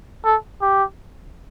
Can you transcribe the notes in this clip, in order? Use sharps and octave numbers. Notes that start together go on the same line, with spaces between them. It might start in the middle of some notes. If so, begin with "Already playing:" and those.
A4
G4